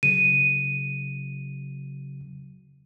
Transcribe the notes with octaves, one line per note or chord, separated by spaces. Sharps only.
C#3 F#3 D#7